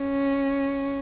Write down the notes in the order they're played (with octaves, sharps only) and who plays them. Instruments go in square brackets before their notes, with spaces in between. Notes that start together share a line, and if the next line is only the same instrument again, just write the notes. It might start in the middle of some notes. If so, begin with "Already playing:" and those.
Already playing: [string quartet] C#4